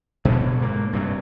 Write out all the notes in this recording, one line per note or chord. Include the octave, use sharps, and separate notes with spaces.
B2 D3 F#3
G#2 A#3
G2 C3 F#3